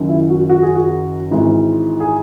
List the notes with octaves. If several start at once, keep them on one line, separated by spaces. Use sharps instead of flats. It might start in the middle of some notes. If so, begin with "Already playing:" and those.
Already playing: F#1 F#2 D#3 F#3
E4
F#4
F#4
G#4
F#4
G#1 G#2 E3
G#4